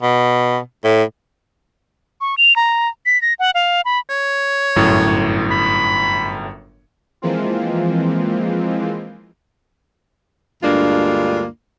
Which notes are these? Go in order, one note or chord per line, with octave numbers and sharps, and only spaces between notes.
B2
A2
C#6
F7
A#5
B6
A#6
F#5
F5
B5
C#5
G1 F#2 A2
B5
E3 F3 G#3 A#3 C4 F4
D2 G2 G#3 A#3 D4 F4